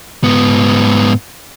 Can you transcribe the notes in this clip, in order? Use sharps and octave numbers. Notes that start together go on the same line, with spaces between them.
G#2 B3